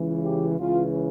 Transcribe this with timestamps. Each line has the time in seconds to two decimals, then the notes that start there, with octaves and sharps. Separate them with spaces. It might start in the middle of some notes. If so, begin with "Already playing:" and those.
Already playing: C#2 C#3 E3
0.24 G4
0.58 C#2 C#3 E3 F4